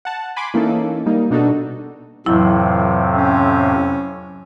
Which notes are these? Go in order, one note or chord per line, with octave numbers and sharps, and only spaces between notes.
F#5 A5
G#5 B5 C6 D6
E3 A#3 C#4 D#4 A4
G3 A#3 D#4
B2 D4 D#4 F#4 A4
F2 A2 C3 E3 F#3 E4
C#4